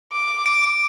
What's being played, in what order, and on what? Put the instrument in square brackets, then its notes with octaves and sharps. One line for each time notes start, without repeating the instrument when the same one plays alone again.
[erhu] D6
[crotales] D7